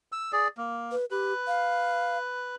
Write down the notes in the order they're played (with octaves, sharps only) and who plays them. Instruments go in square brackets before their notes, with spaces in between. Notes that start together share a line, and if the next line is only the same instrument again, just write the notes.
[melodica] E6
G#4 D5
A#3
[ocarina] B4
[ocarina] G4 [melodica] B4
[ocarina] F5